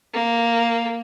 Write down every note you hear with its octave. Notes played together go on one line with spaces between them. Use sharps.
A#3